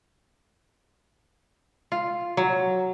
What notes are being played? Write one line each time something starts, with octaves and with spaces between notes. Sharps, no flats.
F4
F#3